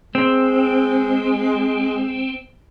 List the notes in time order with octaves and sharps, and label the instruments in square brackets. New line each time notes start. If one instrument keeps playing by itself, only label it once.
[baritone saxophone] G#3 [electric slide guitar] C4